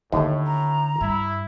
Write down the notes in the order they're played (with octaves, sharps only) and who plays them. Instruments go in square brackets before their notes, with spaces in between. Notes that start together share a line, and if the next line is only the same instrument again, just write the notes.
[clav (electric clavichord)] D#2 A3 [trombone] A2 [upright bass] D3
[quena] A#5
[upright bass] G2 [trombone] E4